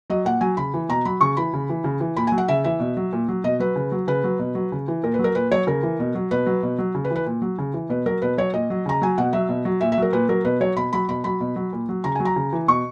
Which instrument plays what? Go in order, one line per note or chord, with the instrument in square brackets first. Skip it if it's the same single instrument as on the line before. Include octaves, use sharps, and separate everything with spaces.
[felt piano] F#3 D#5
A#2 F#5
F#3 G#5
C#3 B5
E3
B2 A#5
F#3 B5
C#3 C#6
E3 B5
C#3
E3
C#3
E3
A#2 B5
G#5
F#3
F#5
C#3 E5
E3 E5
B2
F#3
A#2
F#3
B2 D#5
F#3 B4
C#3
F#3
C#3 B4
F#3
B2
F#3
C#3
E3
A#2 A#4
B4
F#3
A#4
A#2 B4
F#3 C#5
C#3 A#4
E3
B2
F#3
B2 B4
F#3
B2
F#3
C#3
B4
E3
B4
A#2
F#3
C#3
E3
B2 B4
F#3 A#4
B2 B4
F#3 C#5
A#2 D#5
F#3
C#3 A#5
F#3 G#5
B2 F#5
F#3 E5
B2
F#3
A#2 E5
E5
F#3 A#4
A#2 B4
F#3 A#4
B2 B4
F#3 C#5
B2 B5
F#3 B5
B2 B5
F#3 B5
B2
F#3
A#2
F#3
C#3 A#5
G#5
F#3
A#5
C#3
E3
B2 C#6